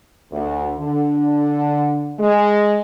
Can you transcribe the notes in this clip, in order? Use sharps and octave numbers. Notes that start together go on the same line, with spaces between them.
D2
D3
G#3